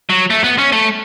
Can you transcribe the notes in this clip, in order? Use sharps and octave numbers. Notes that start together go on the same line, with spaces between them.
F#3
A3
B3
C#4
A3